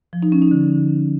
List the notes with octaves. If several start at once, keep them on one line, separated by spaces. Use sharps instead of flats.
F3
D#4
C#4
D#4
D3